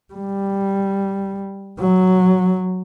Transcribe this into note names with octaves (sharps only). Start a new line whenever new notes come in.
G3
F#3